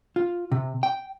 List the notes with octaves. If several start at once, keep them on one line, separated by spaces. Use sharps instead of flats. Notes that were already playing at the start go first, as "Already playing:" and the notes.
F4
C3
G5